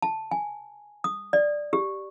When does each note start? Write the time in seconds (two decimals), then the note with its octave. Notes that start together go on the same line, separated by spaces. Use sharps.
0.02 A5
0.31 G#5
1.04 D#6
1.33 D5
1.73 G4